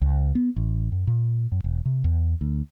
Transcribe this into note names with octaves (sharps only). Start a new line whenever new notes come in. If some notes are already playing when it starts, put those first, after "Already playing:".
C#2
B3
A1
F#2
A#2
F#2
E1
C3
E2
D2